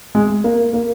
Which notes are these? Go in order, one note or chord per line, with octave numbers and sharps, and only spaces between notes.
G#3
A#3
A#3